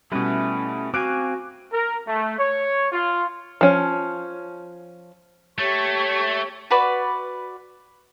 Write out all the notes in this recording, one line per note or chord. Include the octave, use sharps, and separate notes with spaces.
B2 G3 A3 C#4 E4 B4
C4 F#4 F5 G#5 D6 F#6 D7
A#4
A3
C#5
F4
F3 C#4
A3 G4 C#5 C#6
F#4 B4 D5